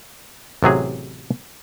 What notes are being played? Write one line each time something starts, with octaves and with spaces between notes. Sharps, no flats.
A1 C3 F#3 G#4